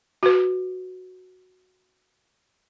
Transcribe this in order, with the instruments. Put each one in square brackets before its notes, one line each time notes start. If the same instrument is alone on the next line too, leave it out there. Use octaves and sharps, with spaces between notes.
[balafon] F#4 B4